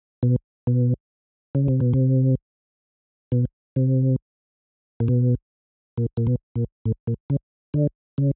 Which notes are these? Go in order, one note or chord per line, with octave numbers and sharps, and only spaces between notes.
B2
B2
C#3
C3
B2
C3
B2
C3
A#2
B2
A#2
A#2
B2
A#2
A2
A#2
C#3
D3
C#3